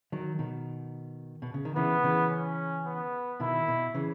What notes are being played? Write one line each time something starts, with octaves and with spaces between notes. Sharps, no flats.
D#3 F#3
B2 D#3
B2
C#3
D#3
C#3 E3 B3
C#3 E3
C#4
B3
B2 D#3 E4
B2
C#3 E3